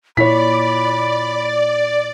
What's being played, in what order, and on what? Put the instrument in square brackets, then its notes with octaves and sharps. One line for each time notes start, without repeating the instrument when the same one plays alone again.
[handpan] A#2 E4 [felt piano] C#5 B6 [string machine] D5 [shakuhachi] B5